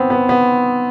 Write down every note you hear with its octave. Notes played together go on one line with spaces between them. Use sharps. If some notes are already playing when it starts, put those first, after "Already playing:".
Already playing: B3 C4
B3
B3